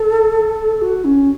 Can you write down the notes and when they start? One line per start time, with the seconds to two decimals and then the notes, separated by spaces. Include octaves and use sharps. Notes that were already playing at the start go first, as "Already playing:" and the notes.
Already playing: A4
0.81 F#4
1.04 C#4